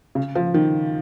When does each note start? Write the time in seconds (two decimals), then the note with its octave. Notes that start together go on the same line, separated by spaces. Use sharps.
0.15 C#3
0.35 F3
0.54 D#3